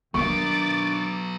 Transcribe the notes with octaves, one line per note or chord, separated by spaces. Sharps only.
D#3 F#3 B3 D4 C#6 D6 A6